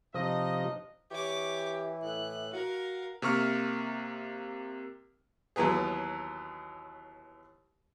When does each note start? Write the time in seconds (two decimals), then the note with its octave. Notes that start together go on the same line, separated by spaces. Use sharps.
0.14 C3 F3 D4 D#4 D#5
1.11 E3 G4 C#5 D6
2.03 A2 F#6
2.53 F#4 A#4 F5
3.22 C3 A#3 C#6 F6
5.56 D#2 E3 F#3 B3 G#4